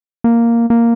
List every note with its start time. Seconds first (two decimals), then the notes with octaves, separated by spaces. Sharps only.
0.24 A#3
0.70 A#3